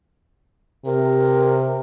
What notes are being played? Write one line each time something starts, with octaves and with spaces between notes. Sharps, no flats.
C3 A#4